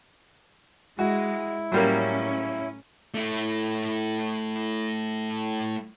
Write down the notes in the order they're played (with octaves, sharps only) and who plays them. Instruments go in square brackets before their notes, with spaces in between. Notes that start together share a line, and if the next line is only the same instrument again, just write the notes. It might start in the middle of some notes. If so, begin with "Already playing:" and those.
[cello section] G#3 [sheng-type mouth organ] E4 [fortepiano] F#4
[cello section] A2 C#4 [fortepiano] F#3 G3 A#3
[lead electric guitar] A3 E4